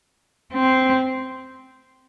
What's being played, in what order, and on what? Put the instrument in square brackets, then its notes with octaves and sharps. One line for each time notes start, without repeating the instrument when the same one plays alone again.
[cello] C4